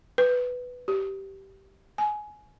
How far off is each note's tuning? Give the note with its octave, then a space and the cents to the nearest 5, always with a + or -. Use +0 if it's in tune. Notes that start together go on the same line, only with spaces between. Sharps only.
B4 +5
G4 -15
G#5 +20